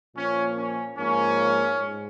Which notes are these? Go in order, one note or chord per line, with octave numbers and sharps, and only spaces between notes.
A#2 F3 A#3 C#4
C#4
G#2 F3 A#3 C#4
G#2